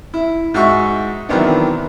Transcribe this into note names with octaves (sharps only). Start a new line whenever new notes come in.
E4
G#2 F#4 E5 C#6
D#3 E3 F#3 B3 C4 D4